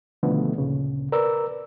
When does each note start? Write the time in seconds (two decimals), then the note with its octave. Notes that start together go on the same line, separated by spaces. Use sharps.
0.23 B2 D3 D#3 F3 A3 B3
0.58 D2 A#2 C#3
1.12 A#4 B4 D5 E6